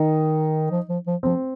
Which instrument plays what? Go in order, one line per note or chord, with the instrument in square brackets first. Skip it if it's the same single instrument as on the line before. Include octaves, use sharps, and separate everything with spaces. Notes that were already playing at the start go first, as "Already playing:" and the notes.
Already playing: [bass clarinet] D#3 [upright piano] D#4
[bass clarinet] F3
F3
F3
[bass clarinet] F3 [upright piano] C4